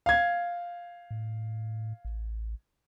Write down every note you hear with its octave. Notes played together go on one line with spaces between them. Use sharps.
F5 G#6
A2
A1